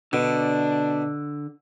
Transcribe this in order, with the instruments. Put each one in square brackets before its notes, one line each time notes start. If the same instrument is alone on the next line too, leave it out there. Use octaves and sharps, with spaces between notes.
[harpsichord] B2 [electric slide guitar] D3 [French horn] D4